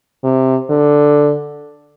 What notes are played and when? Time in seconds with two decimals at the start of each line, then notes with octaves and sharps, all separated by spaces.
0.24 C3
0.70 D3